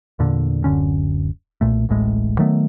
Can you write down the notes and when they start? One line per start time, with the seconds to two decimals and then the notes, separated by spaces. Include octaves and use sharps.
0.19 E2 A#2 D3
0.64 D1 F#2 D3 C#4
1.61 B1 F2 A#2 A3
1.89 D1 A1 A2 G#3
2.39 D#3 F#3 A3 B3